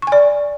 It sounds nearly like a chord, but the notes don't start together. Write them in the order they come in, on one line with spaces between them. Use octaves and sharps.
C#6 G#5 D5